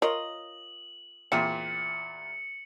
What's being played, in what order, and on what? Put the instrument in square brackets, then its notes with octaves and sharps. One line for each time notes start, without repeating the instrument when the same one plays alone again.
[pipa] F4 A#4 D#5 [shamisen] C#5 [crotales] F#7
[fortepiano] E2 A#2 [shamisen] C4 [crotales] C#7